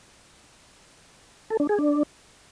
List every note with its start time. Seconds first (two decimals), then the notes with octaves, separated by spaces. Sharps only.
1.50 A4
1.60 D4
1.69 G#4
1.79 D4